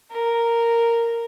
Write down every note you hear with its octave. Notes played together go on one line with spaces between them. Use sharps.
A#4